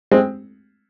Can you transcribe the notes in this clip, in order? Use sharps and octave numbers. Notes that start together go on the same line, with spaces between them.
G#3 C4